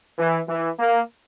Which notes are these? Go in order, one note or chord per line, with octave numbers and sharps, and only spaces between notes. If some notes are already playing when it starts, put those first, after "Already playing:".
E3
E3
A#3